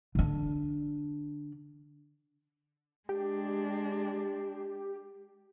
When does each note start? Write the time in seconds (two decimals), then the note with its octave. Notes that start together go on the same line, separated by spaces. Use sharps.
0.15 D3 D4
3.09 G#3 D4 G4